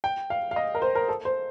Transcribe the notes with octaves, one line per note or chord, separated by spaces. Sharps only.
G5
F5
F5
D#5
A#4
C5
A#4
A4
C5